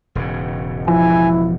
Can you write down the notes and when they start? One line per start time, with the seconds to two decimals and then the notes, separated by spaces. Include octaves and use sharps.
0.15 E1 G#2 C#3
0.88 F3 E4 G#5